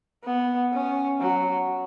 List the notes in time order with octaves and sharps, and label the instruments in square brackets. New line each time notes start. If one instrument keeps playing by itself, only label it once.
[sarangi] B3
C#4
F#3